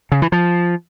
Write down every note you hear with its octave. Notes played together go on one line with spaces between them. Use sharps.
C#3
E3
F3